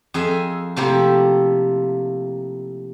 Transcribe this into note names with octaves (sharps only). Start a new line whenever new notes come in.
F2 G#4 D#5 E5
C3 F3 A3 A#3 E4 G4